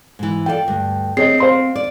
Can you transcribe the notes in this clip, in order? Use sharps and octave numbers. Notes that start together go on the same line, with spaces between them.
G#2 E3
F4 A4 D5 G5
D2 G2
C4 G#4 C#5 D#5 C7
C5 F5 C6
D5